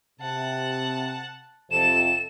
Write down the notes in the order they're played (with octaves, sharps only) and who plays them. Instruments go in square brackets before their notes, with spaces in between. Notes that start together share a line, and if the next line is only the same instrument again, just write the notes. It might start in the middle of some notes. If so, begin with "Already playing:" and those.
[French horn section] C3 [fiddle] F#5 A5
[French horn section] F2 C3 F3 [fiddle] A4 A5 [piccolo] E7